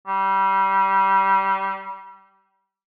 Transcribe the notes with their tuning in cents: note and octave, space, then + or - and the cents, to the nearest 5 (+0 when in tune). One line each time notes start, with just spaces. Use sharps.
G3 -20